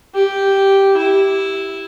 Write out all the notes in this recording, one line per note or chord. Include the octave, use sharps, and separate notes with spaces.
G4
E4